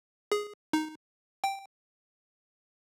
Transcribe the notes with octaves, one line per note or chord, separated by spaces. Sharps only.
G#4
D#4
G5